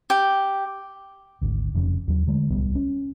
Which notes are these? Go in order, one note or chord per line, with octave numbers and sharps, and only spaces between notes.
G4
G#1 D2
F1 F2 C#3
D#2 F#3
D3 G#3 A3
D1 C2 G3 B3
C#4